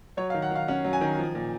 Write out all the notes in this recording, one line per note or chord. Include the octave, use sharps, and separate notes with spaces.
F#3 C#5
F5
D#3
F#5
D#3 F5
C#4 F#5
F#3
G#5
D#3
F3
A#2